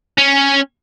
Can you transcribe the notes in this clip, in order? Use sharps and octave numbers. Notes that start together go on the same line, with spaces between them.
C#4